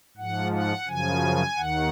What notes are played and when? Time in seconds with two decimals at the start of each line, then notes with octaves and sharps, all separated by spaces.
0.17 G#2 F3 F#5
0.52 F#5
0.87 F#2 C#3 F3 G#5
1.56 D#2 D#3 F#5